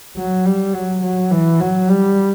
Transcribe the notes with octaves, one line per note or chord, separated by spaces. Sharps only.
F#3
G3
F#3
F#3
E3
F#3
G3